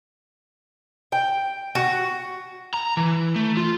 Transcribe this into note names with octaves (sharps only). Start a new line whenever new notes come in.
G5
F#4
A#5
E3
A3
F4